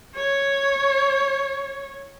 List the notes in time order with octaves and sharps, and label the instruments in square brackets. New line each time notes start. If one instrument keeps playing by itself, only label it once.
[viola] C#5